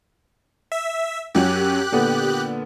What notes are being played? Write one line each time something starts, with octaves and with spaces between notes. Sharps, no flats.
E5
F#2 F#3 C#4 G4 F#6
A#2 D3 B3